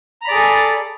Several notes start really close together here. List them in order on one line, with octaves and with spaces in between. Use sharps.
A#5 B5 D5 G#4 A4